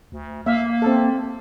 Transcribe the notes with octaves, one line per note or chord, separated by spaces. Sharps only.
D2
A#3 E5 F5
C4 A4